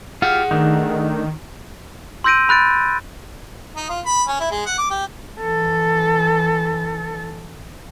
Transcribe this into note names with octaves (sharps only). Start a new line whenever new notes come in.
F4 G4 G#4 F5 F#5
D#3 A3 D4 D#4
C6 E6 G6 A#6 D7 D#7
B5 F#6 A6 D7
D#4
F4
B5
C#4
E4
G#3
F#5
D6
G4
E3 A4